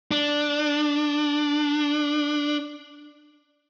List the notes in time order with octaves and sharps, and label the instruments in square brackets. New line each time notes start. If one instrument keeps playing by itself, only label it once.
[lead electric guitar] D4